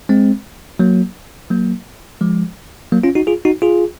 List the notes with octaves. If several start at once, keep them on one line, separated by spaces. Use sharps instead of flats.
G#3 C4
F#3 A#3
F#3 A#3
F3 G#3
F#3 A#3
C#4 F4
D#4 F#4
F4 G#4
D#4 F#4
F4 G#4